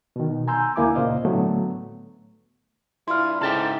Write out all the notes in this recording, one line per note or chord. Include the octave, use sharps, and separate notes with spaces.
B2 D#3
G#5 A#5 C6 E6 G6
D2 A#3 E4 G#5 D6
A#2 C#3 C5 D#5 F5
A2 D3 F#3 A3 B3
G2 E4 F4 C6 F6
G#2 C#3 E4 G4 A4 G5 A5